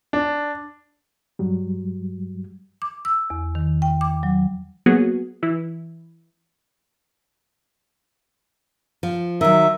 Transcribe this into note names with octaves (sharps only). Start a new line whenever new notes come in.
D4
G2 F#3 G3
D6
E6
E2
D#3
G5
D6
F#3
F#3 A#3 B3 F#4 G#4
E3 E4
F3
D#3 F#3 E5